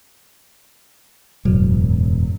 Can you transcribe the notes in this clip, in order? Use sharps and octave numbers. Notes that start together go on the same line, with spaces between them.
E1 F#2 A2 F#3